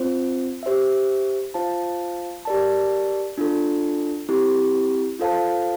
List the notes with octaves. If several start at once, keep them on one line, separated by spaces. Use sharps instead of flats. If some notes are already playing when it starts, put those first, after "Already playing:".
Already playing: C4 F4 C5
G4 C5 E5
F4 C5 F5 A5
G4 A#4 D5 A5
D4 F4 A4
C4 E4 G4
F4 A4 C5 F5 A5